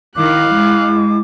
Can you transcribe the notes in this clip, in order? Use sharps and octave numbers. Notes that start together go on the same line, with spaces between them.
D#3 E4 F5 D6 F#6
G#3